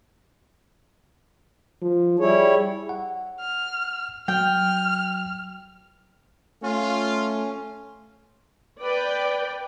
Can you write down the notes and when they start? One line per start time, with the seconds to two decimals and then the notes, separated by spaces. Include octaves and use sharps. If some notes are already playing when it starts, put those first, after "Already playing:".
1.82 F3
2.19 G3 E4 G#4 C#5
2.89 F#5
3.40 F6
4.28 F#3 G5 F6
6.62 A3 C#4 F4
8.83 B4 D5 G5